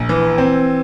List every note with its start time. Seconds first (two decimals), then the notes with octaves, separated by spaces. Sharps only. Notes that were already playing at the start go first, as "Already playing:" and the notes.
Already playing: A#1
0.09 E3
0.38 C4